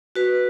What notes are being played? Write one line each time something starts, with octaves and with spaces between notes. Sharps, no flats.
F#4 B4